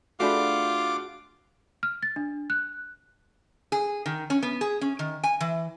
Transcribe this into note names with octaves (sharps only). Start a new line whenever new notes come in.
A3 D4 F4 F#4 G#4 B5 D6
F6
A6
D4
F#6
G#4
D#3
C#4
B3
G#4
C#4
D#3
G#5
E3